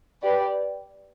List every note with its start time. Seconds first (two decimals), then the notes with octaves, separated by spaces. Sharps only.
0.23 G4 B4 D5